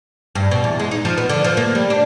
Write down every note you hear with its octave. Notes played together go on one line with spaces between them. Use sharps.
G2
B2
E2
G#3
D#4
F3
B3
D3
F3
A#3
G3
D4